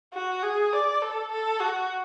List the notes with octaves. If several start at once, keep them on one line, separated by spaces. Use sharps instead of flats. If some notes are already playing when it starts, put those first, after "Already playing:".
F#4
G#4
D5
A4
A4
F#4